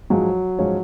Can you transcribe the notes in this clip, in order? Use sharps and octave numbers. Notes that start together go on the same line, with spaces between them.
G#2 F3 F#3 G#3 C#4
G#2 F3 G#3 C#4